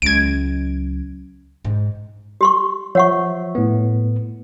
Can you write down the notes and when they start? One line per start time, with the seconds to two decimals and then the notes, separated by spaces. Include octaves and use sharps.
0.02 C#2 F#3 G#6 D7
1.65 G#2
2.41 G4 C6 C#6
2.95 F3 C#5 E5 F#5 C#6
3.55 A2 B3